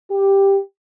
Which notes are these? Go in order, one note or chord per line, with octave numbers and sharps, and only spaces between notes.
G4